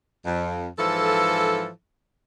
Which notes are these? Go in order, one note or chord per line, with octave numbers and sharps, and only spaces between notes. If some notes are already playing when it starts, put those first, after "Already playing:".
F2
G#2 E3 F3 A4